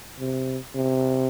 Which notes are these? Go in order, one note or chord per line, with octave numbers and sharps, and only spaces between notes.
C3
C3